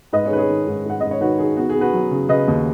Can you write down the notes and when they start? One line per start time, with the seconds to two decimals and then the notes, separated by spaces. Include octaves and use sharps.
0.13 G#2 B4 D#5
0.26 G#4 C#5
0.31 D#3 B4
0.37 G#4 C#5
0.50 D#3
0.67 G#2
0.85 G#2 F#5
1.00 G#2 D#5
1.11 C#5
1.21 D#3 F#4 B4
1.39 D#3 G#4
1.57 B3 F#4
1.70 G#4
1.75 B3
1.81 F#4 B4
1.94 F#3
2.11 C#3
2.29 C#3 B4 D#5
2.48 D#2